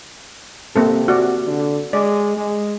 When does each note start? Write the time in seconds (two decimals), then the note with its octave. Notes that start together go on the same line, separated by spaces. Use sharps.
0.76 C3 A#3 C4 A4
1.08 F#4 D5
1.47 D3
1.93 G#3 D5
2.36 G#3